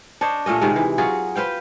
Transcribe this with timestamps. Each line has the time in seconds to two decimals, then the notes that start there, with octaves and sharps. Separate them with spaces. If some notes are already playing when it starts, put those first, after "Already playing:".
0.21 D4 C5 C#5 D#5
0.46 A#2 A3 C#4 D#5
0.61 C3 D#3 G#3
0.76 E3
0.98 F#3 F4 F#4 G#4
1.35 B4 C5 F5 G5